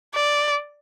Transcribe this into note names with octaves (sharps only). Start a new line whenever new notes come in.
D5